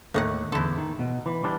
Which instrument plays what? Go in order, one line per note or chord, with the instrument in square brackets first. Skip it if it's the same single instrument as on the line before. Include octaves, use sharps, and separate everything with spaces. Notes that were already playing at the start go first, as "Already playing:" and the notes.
[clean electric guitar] D#2 A3 [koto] A2 D#3 F#5
[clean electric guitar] E2 D3 [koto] E4 A4
[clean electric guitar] D#3
B2
E3
E3 G3 D4